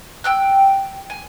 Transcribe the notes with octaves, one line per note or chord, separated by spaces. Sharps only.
G5 E6 F#6
G#5